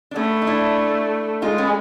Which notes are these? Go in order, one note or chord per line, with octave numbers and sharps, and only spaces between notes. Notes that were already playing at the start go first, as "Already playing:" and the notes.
D4
A3 B3 C#4
D#4
D4 E4
G#3 D#4 F4
B3 C#4